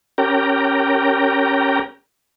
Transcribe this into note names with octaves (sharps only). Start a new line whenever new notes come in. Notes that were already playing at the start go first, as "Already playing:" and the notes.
C#4 G4 A#4 G5 A#5